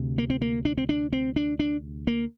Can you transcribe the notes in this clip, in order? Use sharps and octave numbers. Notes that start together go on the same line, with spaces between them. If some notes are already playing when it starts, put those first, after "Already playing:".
Already playing: D2 C3
A#3
C4
A#3
D4
C4
D4
C4
D4
D4
A#3